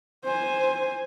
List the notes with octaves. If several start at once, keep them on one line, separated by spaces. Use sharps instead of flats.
C5 G#5